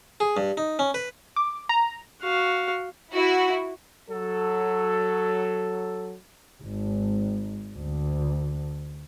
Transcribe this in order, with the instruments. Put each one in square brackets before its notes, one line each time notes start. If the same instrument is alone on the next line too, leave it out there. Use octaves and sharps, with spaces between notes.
[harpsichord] G#4
G2
D#4
C#4
B4
[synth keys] D6
A#5
[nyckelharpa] F#4 F5
[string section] E4 F#4
[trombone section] F#3 A4
[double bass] G#1
D2